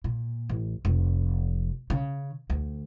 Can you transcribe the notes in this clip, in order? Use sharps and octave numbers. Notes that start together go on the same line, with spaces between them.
A#2
A1
F1
C#3
D2